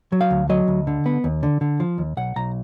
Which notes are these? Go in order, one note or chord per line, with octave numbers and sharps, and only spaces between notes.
F#3
F5
D2
F#3 D#5
D2
D3
B3
D#2
D3
D3
F3
D#2
B1 F#5
B1 A#5